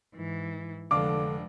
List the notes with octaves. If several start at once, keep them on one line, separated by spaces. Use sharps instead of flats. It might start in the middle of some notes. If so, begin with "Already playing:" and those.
G#2 E3
F1 D3 F3 G#3 D4 F5 D6